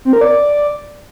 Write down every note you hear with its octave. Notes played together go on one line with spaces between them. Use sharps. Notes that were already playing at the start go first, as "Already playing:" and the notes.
C4
A#4
D5